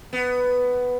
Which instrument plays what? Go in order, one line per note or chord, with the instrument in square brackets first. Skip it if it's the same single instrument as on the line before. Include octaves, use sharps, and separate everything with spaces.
[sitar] B3